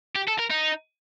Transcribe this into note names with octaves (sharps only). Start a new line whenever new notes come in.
G4
A4
A#4
D#4